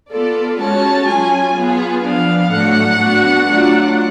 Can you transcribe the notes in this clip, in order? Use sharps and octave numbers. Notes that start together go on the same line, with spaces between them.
B3 F4 A4 D5
G#3 C#4 F#4 C#5 A5
F#3 C#4 F4 G#4 G#5
B3 F4 G#4
F3 B3 D4 F5
A2 F#3 A3 D4 F#5
B3 D4 F#4
F#3 A3 D4 F4